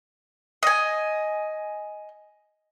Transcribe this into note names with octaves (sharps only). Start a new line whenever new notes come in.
D#5 G#5